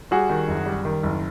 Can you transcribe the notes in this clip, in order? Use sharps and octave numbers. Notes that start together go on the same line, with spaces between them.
G3 F#4 G#4
D#3
F#1
G3
D#3
F#1